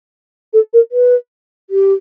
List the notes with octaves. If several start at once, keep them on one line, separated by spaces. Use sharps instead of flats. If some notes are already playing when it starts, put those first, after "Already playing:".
A4
A#4
B4
G4